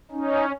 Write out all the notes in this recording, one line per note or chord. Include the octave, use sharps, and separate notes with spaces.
C#4 D#4